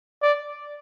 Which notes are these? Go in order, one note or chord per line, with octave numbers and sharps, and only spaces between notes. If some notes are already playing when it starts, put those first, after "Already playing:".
D5